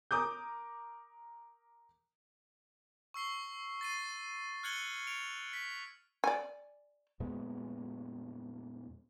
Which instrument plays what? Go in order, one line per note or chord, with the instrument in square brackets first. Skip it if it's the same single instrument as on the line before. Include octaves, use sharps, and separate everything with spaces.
[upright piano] A#4 D6 D#6 G6
[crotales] C#6 E6 C7 G7
A6 C7 D#7
F6 F#6 G#6 C#7 F#7 G7
D7 F7
B6
[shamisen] D5 G#5
[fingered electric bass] F2 A#2 G#3 B3